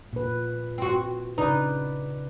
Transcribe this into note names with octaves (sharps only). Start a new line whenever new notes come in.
A#2 B4
C4 F#4
C#3 D#4 B4 D5